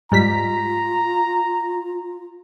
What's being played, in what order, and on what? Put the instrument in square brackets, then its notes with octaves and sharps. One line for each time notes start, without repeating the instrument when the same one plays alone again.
[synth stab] G#2 G3 B6 [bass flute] F4 [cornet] A#5